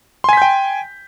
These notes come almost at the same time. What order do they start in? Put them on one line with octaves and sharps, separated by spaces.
C6 G#5 B6 G6 G5